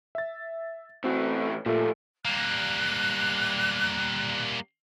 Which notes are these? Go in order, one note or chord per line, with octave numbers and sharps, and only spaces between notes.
E5 A6
A2 E3 C4 F#4
A#2 F3 A3
G3 A#3 F#6